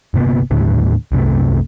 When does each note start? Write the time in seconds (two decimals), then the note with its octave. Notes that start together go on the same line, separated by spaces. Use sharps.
0.14 G1 C3 A#3 B3
0.51 D#2 A2 D3 G3
1.12 C2 F#2 C3 A3